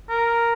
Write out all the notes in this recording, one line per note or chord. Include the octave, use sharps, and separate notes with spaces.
A#4